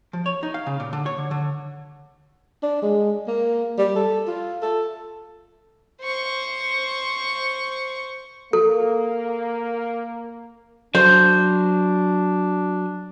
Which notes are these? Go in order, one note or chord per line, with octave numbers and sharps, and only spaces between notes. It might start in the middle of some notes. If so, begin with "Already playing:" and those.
F3
C#5
D#4
F5
C#3
A#2
D3
C#5
D3
D3
D4
G#3
A#3
G3
A4
F4
A4
C5 C#6
A#3 A4
F#3 D4 C5